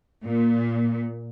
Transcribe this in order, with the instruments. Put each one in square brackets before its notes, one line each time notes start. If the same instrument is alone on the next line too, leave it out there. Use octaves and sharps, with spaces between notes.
[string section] A#2